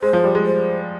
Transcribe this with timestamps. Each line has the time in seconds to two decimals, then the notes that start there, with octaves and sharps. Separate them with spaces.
0.02 G#3 C5
0.13 F3
0.24 G3
0.35 G#3
0.46 C5